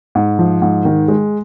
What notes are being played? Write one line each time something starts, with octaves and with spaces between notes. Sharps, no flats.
G#2
F3
G#2
D#3
G#3